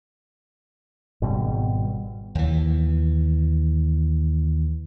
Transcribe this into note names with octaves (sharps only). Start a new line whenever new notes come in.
G#1 B2 G3
D#2 E3